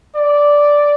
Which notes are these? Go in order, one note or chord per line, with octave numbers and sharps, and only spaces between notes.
D5